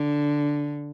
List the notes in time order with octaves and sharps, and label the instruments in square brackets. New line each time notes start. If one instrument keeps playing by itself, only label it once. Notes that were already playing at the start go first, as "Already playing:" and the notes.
Already playing: [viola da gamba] D3